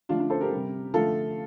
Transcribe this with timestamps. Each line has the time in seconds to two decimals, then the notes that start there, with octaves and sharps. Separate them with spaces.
0.09 D3 F3 A3 D4 F4
0.20 D4
0.30 A4 C5
0.41 G4 A#4
0.51 C3 G3
0.93 D3 F3 A3 F4 A4